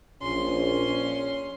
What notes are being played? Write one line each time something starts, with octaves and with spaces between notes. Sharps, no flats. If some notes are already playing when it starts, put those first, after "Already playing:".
A#1 C#4 C6